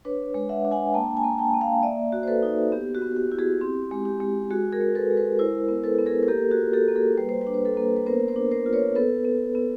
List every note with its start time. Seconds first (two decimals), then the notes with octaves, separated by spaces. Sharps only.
0.05 D4 B4 C#5
0.34 G#3
0.49 E5 F#5
0.65 D4
0.71 F#5 G#5
0.94 A#3 G5 A5
1.17 G#5 A#5
1.24 A#3
1.38 G5 A5
1.54 A#3
1.61 F5 G5
1.83 A#3 D5 E5
2.12 F#4
2.23 C5
2.28 A4 B4
2.43 D#4
2.72 B3 G4
2.95 F#4
3.02 B3
3.16 G4
3.31 E4 G4
3.39 F#4 G#4
3.61 C4 G4
3.91 G#3
4.05 G4
4.20 G#3
4.51 G#3 F#4 G#4
4.72 G#4 A#4
4.81 G#3
4.95 A4 B4
5.10 G#3
5.17 A4 B4
5.39 E4 A#4 C5
5.69 B3
5.84 A4 B4
5.98 B3
6.06 G#4 A#4
6.23 A#4
6.28 A#3 G4 A4
6.51 F#4 G#4
6.58 F4
6.73 G4 A4
6.88 A#3
6.95 G#4 A#4
7.18 G3 B4
7.29 C5
7.41 B4
7.47 D4
7.54 C5
7.65 A4 B4
7.77 A#3
7.96 B4
8.06 B3 A#4 C5
8.28 A#4 C5
8.36 D4
8.51 A#4 C5
8.66 F4
8.73 B4 C#5
8.95 B3 A4 B4
9.25 B3
9.55 B3